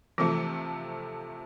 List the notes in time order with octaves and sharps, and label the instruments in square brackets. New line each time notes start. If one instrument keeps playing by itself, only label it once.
[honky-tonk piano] C3 F3 A3 [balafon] E3